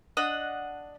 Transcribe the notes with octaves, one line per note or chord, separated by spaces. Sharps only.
D4 D#5 F#5 D#6